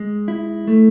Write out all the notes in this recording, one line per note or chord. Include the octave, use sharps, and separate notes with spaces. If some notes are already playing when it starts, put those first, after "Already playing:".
Already playing: G#3
E4
A3